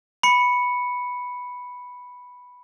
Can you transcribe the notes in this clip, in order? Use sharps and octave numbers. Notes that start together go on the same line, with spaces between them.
B5 C#7